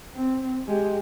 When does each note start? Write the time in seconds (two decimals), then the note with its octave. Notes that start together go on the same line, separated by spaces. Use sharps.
0.14 C4
0.68 G#3 G4